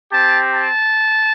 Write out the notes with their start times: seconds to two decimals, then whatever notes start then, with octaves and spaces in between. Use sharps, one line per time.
0.11 C4 G4 A5
0.52 A5